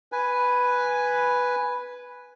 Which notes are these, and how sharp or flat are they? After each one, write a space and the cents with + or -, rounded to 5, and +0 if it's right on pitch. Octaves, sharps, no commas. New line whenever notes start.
B4 +0 G#5 +0